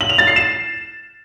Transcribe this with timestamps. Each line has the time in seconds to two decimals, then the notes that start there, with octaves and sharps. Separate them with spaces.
0.01 F#7
0.09 F7
0.18 A6
0.27 C7
0.36 E7